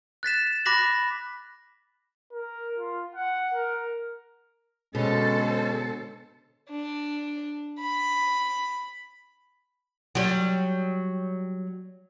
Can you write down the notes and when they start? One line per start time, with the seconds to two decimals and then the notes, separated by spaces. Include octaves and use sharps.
0.23 F#6 A6 B6 E7
0.65 B5 D6 F#6 A#6 B6 F#7
2.32 A#4
2.78 F4
3.15 F#5
3.54 A#4
4.95 B2 D3 G#3 C#4 A4 C5
6.70 D4
7.80 B5
10.15 F#3 G3